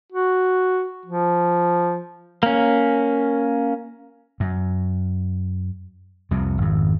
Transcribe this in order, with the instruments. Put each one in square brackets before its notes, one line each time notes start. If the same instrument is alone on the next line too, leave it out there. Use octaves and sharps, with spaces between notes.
[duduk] F#4
F3
[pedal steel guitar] A#3 C#4
[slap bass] F#2
C2 F2 C3
G#1 F2